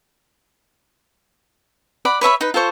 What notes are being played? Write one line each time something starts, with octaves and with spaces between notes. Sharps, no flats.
D5 F#5 B5
B4 C#5 E5 B5
D#4 B4
F4 A4 C5 C#6